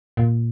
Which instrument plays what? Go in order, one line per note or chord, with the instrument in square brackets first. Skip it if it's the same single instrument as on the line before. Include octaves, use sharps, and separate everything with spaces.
[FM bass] A#2